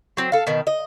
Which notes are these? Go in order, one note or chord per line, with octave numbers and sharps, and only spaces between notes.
F#3 C4
A4 F5
B2 D#3
D#5